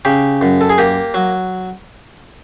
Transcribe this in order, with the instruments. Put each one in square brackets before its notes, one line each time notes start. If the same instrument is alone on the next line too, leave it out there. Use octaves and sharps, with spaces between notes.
[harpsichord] C#3 G4
F#2
A4
G#4
A#3 G4
F#3